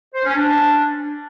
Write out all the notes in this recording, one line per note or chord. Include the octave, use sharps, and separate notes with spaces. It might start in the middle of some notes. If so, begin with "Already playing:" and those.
C5
C#4
D4